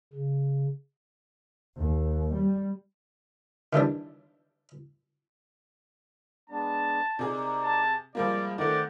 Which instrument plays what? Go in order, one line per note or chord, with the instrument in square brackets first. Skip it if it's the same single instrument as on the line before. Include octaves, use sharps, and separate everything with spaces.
[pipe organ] C#3
[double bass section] D#2
G3
[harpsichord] D#3 E3 G3 D4
[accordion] G#3 B3 D4 [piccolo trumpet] A5
[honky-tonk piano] C3 G#4 [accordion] D#4 A#4 D5
[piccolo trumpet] A5
[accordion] C3 G#3 [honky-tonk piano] F3 G3 A#3 [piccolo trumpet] D5
[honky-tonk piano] D#3 A3 [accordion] C4 F#5 G6 [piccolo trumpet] D5